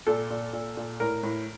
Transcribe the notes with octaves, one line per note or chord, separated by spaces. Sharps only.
A#2 A4
A#2
A#2
A#2
A2 A#4
A2